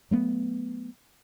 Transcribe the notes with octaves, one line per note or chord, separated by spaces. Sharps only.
F#3 A3 B3